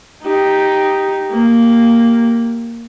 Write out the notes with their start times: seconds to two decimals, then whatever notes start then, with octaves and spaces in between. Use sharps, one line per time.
0.23 D#4 G4
1.33 A#3 G4